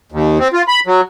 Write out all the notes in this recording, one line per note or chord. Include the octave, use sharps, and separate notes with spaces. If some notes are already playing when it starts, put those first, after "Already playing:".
D#2
C4
F4
B5
F#3